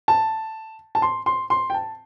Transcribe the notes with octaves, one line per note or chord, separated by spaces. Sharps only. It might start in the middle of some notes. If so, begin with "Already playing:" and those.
A5
A5
C6
C6
C6
G5
A5